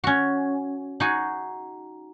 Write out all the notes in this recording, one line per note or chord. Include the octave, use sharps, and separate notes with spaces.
C#4 F#4
D#4 F#4 G#4